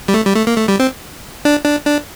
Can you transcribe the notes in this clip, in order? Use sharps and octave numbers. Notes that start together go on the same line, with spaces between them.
G3
A3
G3
A3
A#3
A3
G3
C4
D4
D4
D4